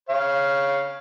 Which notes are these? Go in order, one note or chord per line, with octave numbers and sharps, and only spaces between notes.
C#5 F5